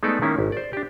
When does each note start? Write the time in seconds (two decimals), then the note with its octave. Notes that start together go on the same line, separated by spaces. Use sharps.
0.03 G#3 A3 B3 D#4 A4 D5
0.22 D#3 A#3 C#4 E4
0.38 G#1
0.52 C5 D5
0.73 D4 G4